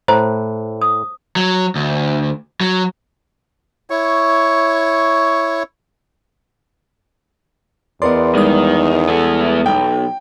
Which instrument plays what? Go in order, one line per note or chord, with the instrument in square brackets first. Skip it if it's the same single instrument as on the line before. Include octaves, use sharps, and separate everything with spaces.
[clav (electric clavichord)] A2 [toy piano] C5 [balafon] A#5
[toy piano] D#6
[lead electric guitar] F#3
D2
F#3
[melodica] E4 C#5 C#6
[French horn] E2 [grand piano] B3 A#4 D5 [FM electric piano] D#5 C6
[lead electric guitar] D#3 [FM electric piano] G3 G#3 D#6
[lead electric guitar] B3 E5 [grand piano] A4
[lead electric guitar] B1 [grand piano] G5